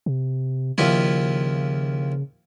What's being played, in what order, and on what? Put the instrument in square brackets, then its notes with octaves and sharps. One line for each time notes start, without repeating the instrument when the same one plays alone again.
[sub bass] C3
[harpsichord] D#2 F3 E4 [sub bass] C#3